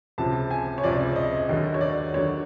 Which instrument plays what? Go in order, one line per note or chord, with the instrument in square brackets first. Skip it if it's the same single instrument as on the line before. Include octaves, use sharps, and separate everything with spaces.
[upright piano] C#2 C3 F3 A5
G#5
C#5
C#2 C3 F3 D5
D#5
D#2 D3 F#3 D#5
C#5
D5
D#2 D3 F#3 C#5